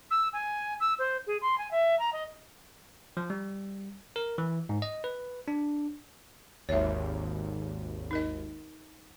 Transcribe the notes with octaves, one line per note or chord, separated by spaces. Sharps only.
E6
G#5
E6
C5
G#4
C6
G#5
E5
A#5
D#5
F3
G3
A#4
E3
G#2
D#5
B4
D4
G#1 D#2 C#5 E5
D#4 A#4 D#5